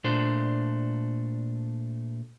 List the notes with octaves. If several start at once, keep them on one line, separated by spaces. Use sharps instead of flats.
A#2 A3 D4 C5